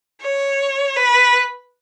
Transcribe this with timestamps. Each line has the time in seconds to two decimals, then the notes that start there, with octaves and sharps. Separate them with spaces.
0.22 C#5
0.97 B4